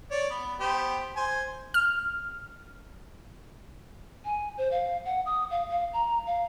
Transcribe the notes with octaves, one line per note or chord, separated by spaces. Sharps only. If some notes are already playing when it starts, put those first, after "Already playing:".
C#5 D5
B3
B3 G4 C5
C5 G#5
F6
G#5
C5
F5
F#5
D#6
F5
F5
A#5
F5